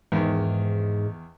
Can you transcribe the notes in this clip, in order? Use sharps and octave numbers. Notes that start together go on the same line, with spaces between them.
E2 G#2 D#3